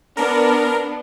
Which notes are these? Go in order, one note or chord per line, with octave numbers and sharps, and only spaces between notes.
B3 D4 A#4